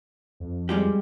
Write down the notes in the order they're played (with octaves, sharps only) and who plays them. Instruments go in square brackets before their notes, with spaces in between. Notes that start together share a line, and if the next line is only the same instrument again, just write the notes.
[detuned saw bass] F2
[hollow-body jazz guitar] G3 G#3 G4